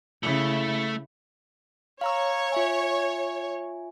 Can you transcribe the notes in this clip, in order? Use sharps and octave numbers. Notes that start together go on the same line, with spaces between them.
C#3 A3 E4
C#5 F5 A#5 E6
F4 E5 G#5